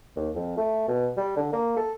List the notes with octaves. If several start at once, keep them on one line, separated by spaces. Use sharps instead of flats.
D#2
F2
A3
B2
G3
D3
A#3
A4